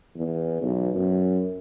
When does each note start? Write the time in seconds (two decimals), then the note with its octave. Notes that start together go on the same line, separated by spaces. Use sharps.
0.16 E2
0.62 B1
0.94 F#2